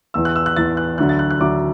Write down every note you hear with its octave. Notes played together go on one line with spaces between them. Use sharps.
E2 E3 E6
F#6
E6
F#6
E2 E3 A6
F#6
D2 D3 F#3 F#6
A6
F#6
F#6
D2 D3 F#3 D6